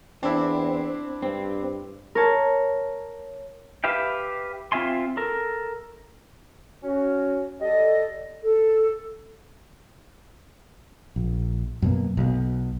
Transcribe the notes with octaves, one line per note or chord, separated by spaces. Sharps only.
E2 C4 D4 E4
G2 C4
A#4 C#5 A5
G4 B4 E5 F5 G5
C4 F4 E5 G#5 C6
A4 A#4
C#4 F#4
G3 A4 D#5
A4
A#1
F#2 B2 A#3
B1 B2